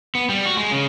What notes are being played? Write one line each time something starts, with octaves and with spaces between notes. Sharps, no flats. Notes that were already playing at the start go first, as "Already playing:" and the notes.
B3
G3
F#4
G#3
C#3